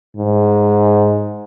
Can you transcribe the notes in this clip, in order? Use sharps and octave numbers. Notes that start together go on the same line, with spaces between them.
G#2